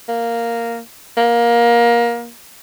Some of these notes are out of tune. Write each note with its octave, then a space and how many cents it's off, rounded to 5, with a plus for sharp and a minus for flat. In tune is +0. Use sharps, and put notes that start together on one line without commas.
A#3 -5
A#3 +20